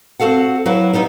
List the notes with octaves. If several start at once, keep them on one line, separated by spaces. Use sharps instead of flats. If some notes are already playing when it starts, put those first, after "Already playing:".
C4 F#4 A4 F5 F#5
F#3 E4 B4 F5
G3 B3 D#4 E4